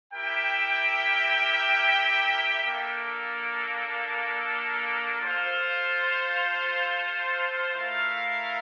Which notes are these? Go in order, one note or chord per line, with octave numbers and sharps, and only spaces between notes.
E4 G4 A#4 E5 G5
A#3 D4 A4
F4 A4 C5 F5
A3 E4 A#4 F5